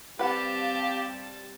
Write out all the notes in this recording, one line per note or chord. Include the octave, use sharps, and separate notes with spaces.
G3 C4 G4 B4 F5 F#5 A5